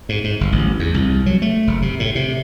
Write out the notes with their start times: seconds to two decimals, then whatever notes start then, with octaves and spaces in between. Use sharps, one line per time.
0.09 G#2
0.24 G#2
0.41 G1
0.52 A1
0.79 E2
0.94 C2
1.26 F#3
1.42 A3
1.67 F#1
1.82 C3
2.00 A2
2.15 C3